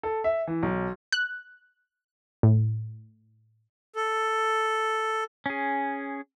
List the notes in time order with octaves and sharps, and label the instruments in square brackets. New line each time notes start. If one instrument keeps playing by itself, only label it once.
[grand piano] A4
E5
E3
B1
[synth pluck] F#6
A2
[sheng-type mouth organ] A4
[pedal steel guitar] C#4 G#4